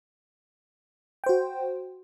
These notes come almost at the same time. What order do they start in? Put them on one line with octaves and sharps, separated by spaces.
G5 C5 F#4